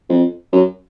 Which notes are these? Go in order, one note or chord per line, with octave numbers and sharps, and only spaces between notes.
F2
F#2